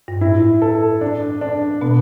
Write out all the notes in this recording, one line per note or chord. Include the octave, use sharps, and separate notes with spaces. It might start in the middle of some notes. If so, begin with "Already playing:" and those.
G2
A2 E4
A4
D4
D4
B2 B3